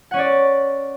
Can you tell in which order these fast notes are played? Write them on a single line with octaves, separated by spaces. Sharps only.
F#5 C#4 C#5 D5